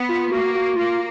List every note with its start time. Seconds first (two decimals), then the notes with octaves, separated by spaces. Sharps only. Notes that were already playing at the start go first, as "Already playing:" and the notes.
Already playing: B3
0.09 F4
0.32 A#3 F#4
0.55 F#4
0.76 A#3 F4